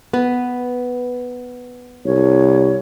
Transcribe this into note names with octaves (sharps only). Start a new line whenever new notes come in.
B3 B4
C2 C#5